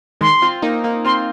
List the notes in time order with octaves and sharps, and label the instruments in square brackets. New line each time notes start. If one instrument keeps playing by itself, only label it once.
[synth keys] D#3 G#3 [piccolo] C6
[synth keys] C4 F4
A#3 D#4
A#3 D#4
[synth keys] C4 F4 [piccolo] C6